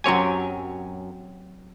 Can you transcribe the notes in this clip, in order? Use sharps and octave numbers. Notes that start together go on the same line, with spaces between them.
F#2 F#3 C4 G4 C#5 G#5